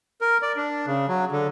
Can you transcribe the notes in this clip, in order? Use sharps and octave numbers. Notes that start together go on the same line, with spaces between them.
A#4
D5
D4
C#3
F#3
D3